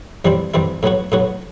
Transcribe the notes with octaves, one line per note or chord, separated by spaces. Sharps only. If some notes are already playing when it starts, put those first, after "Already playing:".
G2 E3 G3 C4 E4
G2 E3 G3 C4 E4
A2 F#3 B3 F#4
A2 F#3 B3 F#4